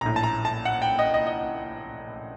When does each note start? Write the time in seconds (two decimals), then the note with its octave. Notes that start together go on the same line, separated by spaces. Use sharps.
0.01 A#1 A2 A#5
0.16 A5
0.23 A#5
0.45 A5
0.65 F#5
0.82 G5
0.99 D#5
1.14 D#5
1.27 D#5